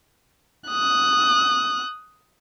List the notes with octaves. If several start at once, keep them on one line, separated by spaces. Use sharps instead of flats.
D#6 F#6